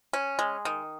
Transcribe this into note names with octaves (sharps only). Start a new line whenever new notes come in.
C#4
G#3
D#3